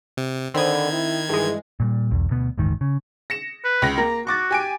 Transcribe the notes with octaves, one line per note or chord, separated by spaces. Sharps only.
C3
D3 D#3 C4 B5 D#6 G#6
E4
G2 E3 G#3 G#4
A#2 F#3 G3
B1 E2
D2 B2 B3
F#1 D2 G#2 D#3
C#3
A#6 C#7 E7
B4
C#2 A#6
A#3 A#5
F#4 C#6 D6 A6
G4 G#5 D7